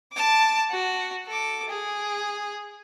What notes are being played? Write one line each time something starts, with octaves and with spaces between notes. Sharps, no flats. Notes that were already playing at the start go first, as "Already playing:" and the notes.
A5 D6
F#4
A4 D6
G#4